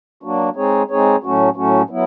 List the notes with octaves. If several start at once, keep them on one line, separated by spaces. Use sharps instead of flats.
F#3 A#3 D4 F#4
G#3 C4 D#4 G#4 C#5
G#3 C4 D#4 G#4 C#5
A2 F#3 A3 C#4 F#4
A2 F#3 A3 C#4 F#4
F#3 B3 E4